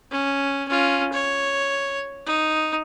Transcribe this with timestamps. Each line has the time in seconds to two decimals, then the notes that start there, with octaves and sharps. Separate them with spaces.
0.11 C#4
0.68 C#4 F4
1.13 C#5
2.26 D#4